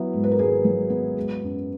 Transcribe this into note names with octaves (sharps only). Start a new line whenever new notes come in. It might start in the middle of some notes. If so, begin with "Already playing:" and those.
Already playing: F#3 B3 E4
G#2
B4
A#4
G#1 G#4
F#3
B3
G#3
F#2